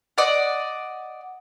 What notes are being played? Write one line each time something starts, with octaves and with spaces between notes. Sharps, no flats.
D5 D#5 F#5